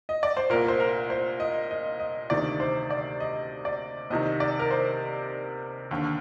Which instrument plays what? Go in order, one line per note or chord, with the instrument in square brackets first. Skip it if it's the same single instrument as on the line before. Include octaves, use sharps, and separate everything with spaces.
[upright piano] D#5
D5
C5
C2 A#2 A#4
C5
A#4
C5
D#5
D#5
D#5
D2 C3 D#3 D5
C5
D5
D#5
D5
C2 C3 D#3 D#5
D5
A#4
C5
D#2 D3